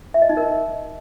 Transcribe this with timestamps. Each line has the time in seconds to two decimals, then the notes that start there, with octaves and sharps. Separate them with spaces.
0.14 E5
0.22 D#5
0.29 D#4
0.37 A#4